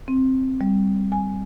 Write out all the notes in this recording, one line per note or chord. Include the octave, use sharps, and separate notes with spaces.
C4
G3
G#5